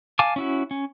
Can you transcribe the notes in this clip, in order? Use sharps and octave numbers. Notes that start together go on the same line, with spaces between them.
F5 G#5 A5 D6
C#4 E4 F#4
C#4